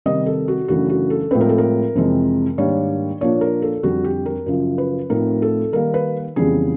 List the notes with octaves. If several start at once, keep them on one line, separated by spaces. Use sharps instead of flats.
C3 D#3 G3 D#5
A4
F#4
F#2 C#3 E3 A3 D4 F#4
F#4
A4
A2 F3 G#3 C4 B4
A#4
A4
A#4
F2 C3 E3 G#3 C4
G#2 D#3 G3 A#3 D4 C#5
A#2 F3 A#3 D4 C#5
A#4
A4
F2 D3 G3 F#4
G4
A#4
F#2 C#3 F3
B4
A2 F3 A3 C4 D#4 A#4
A4
D#3 G3 A#3 A#4
B4
F2 C#3 E3 G3 B3 G#4